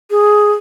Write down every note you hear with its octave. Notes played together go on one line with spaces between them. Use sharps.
G#4